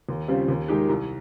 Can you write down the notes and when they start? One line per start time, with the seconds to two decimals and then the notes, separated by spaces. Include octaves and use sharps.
0.09 D#2
0.28 C#3 G3 C4 F4
0.48 D#2
0.68 D#3 G#3 D#4 G4
0.89 C2